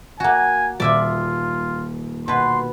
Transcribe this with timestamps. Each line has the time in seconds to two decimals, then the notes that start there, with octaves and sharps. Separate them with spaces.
0.20 A#3 F#4 G#5
0.80 D#1 F4 D5 E5 G#5 E6
2.28 B2 B4 C6